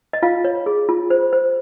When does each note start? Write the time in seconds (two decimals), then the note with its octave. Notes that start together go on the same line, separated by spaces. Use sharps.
0.13 D#5
0.23 F4 F5
0.44 C#5
0.66 G#4
0.89 F4
1.10 C5
1.33 C5